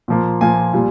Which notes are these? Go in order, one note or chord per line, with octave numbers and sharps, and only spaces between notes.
A#2 F3 A#3
A#2 F3 A#3 G#5
A#2 G3